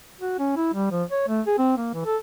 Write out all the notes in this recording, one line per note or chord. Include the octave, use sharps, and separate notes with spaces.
F#4
C#4
E4
G3
F3
C#5
A3
G#4
C4
A#3
E3
A4